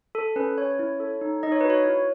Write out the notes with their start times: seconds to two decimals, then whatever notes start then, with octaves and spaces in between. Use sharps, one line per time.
0.15 A4
0.36 C#4 B4
0.58 C#4 C#5
0.79 E4
1.00 A4
1.21 D#4
1.43 D#4 D#5
1.52 C#5
1.61 B4
1.65 F#4
1.70 C#5
1.86 E4